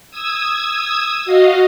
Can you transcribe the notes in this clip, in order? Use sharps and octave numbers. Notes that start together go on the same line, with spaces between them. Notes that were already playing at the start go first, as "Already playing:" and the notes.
D#6 E6 G#6
F#4 D#5 F5